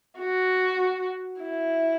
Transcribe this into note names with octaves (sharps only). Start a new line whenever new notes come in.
F#4
E4